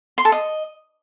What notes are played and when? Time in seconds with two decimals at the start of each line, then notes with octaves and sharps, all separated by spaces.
0.18 C6
0.25 A4
0.32 D#5